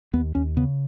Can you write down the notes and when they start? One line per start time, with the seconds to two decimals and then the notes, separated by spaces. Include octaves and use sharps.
0.13 D#2 B3
0.35 D#2 C#4
0.57 C#3 B3